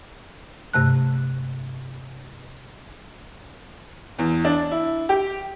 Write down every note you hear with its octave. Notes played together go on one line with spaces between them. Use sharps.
G2 C3 A3 F#6
E2
D4
E4
G4